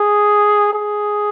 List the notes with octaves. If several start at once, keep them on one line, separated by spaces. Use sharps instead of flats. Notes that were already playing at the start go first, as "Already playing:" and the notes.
Already playing: G#4
G#4